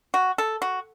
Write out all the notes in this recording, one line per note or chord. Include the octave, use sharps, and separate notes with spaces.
F#4
A4
F#4